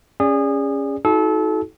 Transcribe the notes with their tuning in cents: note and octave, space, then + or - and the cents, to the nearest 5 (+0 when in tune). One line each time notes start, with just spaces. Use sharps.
C#4 +0 G#4 -25 D5 -5
D#4 +45 F#4 +0 A4 -30